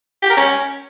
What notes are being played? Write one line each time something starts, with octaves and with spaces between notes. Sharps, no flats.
G4
A#4
C#4